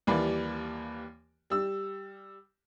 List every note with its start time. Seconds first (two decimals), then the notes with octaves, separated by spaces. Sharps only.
0.07 D#2 E3 G3 A#3 D5 B5
1.50 G3 E6